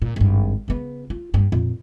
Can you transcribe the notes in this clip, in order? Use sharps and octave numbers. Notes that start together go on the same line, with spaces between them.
A#2
G#1 G2
C#3 B3
F4
G2 A#3
F2 A#2